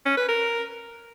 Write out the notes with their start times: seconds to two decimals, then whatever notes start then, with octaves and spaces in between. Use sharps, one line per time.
0.06 C#4
0.17 B4
0.28 A#4